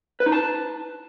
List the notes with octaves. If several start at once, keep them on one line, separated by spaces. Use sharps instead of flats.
B4
D#4
A5